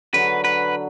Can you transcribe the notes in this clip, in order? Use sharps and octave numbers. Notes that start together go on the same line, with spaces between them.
D3 F#3 B4
B4